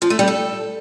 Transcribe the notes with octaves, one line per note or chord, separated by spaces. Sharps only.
F3
A3
G3
A4